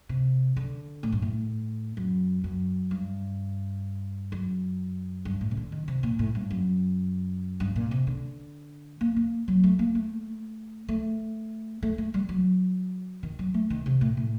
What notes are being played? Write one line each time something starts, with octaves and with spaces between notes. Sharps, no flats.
C3
D3
A2
G2
A2
F#2
F#2
G2
F#2
G2
A2
C3
D3
D#3
C3
A#2
A2
G2
F#2
G2
A#2
C3
D3
A#3
A#3
F#3
A3
A#3
A3
A3
A3
A3
G3
F#3
D#3
F#3
A3
D#3
C3
A2
A2